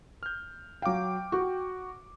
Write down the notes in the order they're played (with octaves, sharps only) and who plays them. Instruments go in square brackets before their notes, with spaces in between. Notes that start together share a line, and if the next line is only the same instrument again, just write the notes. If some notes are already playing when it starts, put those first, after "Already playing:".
[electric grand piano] F6 G6
[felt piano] F#3 F5 [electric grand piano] G5 D6
[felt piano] F#4